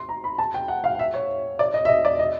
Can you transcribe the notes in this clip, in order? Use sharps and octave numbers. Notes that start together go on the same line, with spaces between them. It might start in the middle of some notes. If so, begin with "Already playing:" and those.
Already playing: C6
A#5
B5
A5
G5
F#5
F5
E5
C#5
D5
D#5
E5
D#5
D5
D#5